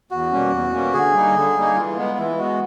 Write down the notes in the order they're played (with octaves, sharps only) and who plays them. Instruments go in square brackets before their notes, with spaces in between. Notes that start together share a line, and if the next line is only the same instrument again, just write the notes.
[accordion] E2 [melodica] F#4
[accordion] B2 G3 A#3 C#4
E2
B2 G3 A#3 C#4
[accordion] D3 [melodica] G#4
[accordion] G3 A#3 D#4
D3
G3 A#3 D#4
[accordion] E3 [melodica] F4
[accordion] G#3 B3
[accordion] E3 [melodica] E4
[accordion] G#3 B3 [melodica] F#4